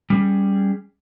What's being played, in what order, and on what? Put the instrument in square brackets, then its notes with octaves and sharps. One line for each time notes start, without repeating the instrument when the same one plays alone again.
[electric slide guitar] G3 C#4 G#4